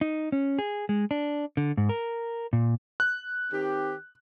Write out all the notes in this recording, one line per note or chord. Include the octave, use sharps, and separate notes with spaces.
D#4
C#4
G#4
G#3
D4
D3
G#2
A#4
A#2
F#6
D#3 C4 G4